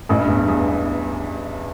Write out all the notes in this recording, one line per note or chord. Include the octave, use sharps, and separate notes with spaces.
A1 A2
G2
E2
G2
E2